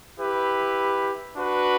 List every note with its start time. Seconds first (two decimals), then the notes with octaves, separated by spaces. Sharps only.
0.19 E4 G4 B4
1.37 D4 F#4 B4